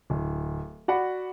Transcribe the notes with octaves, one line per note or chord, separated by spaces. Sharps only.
D1
F#4 D5 F#5 B5